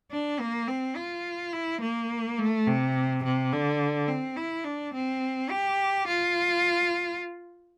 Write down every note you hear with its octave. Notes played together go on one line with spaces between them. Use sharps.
D4
A#3
C4
F4
E4
A#3
A3
C3
C3
D3
C4
E4
D4
C4
G4
F4